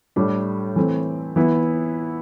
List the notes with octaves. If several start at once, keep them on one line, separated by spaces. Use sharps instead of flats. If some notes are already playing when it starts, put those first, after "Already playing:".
A2 G3 D4
E3 A3 C4
E3 B3 E4